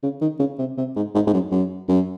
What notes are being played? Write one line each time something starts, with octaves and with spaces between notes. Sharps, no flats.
C#3
D#3
C#3
C3
C3
G#2
G#2
G#2
F#2
F#2
F#2